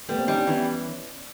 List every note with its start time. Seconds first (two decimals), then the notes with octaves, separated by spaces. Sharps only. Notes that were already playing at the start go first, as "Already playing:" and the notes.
0.09 G3 A3 B3
0.19 A#3 C4
0.28 G3 C#4 D#4
0.38 C4 D4
0.47 E3 B3 C#4